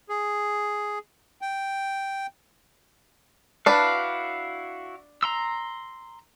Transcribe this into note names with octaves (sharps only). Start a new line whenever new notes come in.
G#4
G5
D4 E4 F#4 B4 F5
A#5 C6 E6